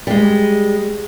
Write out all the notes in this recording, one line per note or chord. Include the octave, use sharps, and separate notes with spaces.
G3 G#3